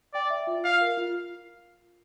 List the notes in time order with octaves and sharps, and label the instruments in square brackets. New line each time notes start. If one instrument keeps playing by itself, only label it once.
[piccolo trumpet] D5 [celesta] G5
[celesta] E5
F4
[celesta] F4 [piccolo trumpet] F5
[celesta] A#4
F4